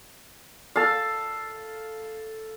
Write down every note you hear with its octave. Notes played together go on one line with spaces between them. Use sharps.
A4 F5